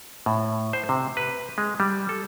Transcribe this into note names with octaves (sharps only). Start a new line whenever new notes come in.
A2
C5
C3
B4
G#3
G3
A4